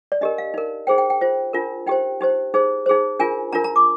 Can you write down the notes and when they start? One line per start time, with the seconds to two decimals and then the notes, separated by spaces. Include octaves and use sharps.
0.12 D5
0.21 D4 G4 A#4 D#5
0.38 F5
0.54 D#4 A#4
0.87 D#4 G#4 C5 G5
0.98 G5
1.10 G5
1.21 F4 C5
1.53 D4 F4 A#4
1.87 D#4 G4 C5 G5
2.21 D#4 G4 C5
2.54 D#4 G#4 C5
2.86 D#4 G#4 C5
3.19 D4 F4 A#4 G#5
3.52 D4 F4 A#4 A#5
3.64 A#5
3.76 D6